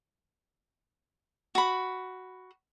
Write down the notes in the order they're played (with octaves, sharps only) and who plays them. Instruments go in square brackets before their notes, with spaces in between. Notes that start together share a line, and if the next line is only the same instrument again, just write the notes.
[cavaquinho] F#4 B5